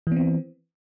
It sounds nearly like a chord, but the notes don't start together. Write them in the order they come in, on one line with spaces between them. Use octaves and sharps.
E3 B3 C4